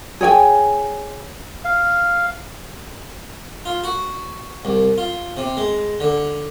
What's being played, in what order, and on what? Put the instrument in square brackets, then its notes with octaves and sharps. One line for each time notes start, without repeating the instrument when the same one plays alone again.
[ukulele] G#4 C#5 G5 G#5
[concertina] F5
[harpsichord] F4
F#4
C2
F4
C3
G#3
D3